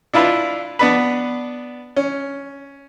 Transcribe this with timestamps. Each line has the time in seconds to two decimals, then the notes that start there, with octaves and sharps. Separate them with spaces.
0.14 D4 E4 F4 B4
0.79 B3 D4 B4
1.96 C#4